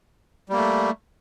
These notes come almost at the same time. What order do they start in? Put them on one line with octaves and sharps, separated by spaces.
G3 A#3 A3